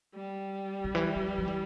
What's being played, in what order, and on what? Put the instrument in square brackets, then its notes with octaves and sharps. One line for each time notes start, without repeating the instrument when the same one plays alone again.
[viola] G3
[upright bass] C#3
E3
E3
F3
F3
E3